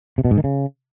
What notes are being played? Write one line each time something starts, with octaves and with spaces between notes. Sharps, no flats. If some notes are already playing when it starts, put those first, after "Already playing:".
C3
B2
G#2
D#3
C#3